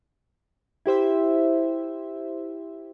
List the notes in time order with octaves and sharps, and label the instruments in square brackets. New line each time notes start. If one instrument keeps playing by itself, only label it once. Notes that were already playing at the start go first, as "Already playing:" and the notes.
[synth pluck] E4 G4 C5 E5